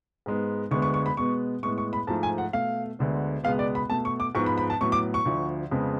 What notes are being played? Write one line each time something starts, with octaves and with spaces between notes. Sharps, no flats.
G#2 G#3 B3
D2 D3 G#3 B3 C#6
C#6
C#6
B5
B2 G#3 B3 C#6
A2 G#3 B3 C#6
C#6
B5
G#2 F3 A3 A5
G#5
F#5
B2 A3 F5
D2 D3 G#3 B3
C#2 B2 G#3 B3 F5
D5
B5
B2 A3 A5
C#6
D6
G#2 F3 B3 C#6
B5
B5
A5
A2 F#3 B3 C#6
D6
C#6
D2 D3 F3
F2 C#3 G#3 B3